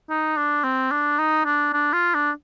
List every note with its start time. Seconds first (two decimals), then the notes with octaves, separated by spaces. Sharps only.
0.10 D#4
0.37 D4
0.64 C4
0.91 D4
1.18 D#4
1.45 D4
1.73 D4
1.93 F4
2.14 D4